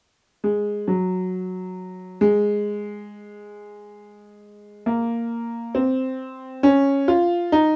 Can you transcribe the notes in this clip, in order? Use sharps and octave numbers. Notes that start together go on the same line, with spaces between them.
G#3
F#3
G#3
A#3
C4
C#4
F4
D#4